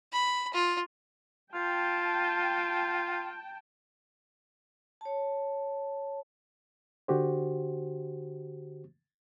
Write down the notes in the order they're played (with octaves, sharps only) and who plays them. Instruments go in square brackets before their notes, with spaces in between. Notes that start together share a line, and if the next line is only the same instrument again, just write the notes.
[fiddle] B5
F4
[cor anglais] F4 [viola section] G5 A5
[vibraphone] C#5 A5
[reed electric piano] D3 F#4 G4 C5